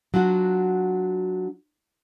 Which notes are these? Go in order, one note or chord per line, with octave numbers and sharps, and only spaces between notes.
F#3 D4 F4 F#4